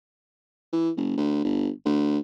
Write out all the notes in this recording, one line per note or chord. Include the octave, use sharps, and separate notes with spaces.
E3
F#1
D2
G1
D2